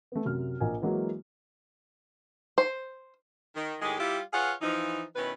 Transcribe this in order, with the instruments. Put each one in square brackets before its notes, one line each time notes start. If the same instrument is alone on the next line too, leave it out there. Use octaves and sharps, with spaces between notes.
[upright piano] A3 B3
F#2 C3 F6
A#1 A#4 D#5 G#5
E3 F#3 G#3 A#3 E4 F#4
[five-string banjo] C5
[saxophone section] D#3
A2 D#3 G#3 G4 G#4
G3 E4 F4 G4
F4 G#4 B4 C#5 F5 F#5
E3 F3 D#4
B2 D#3 C#4 E4 B4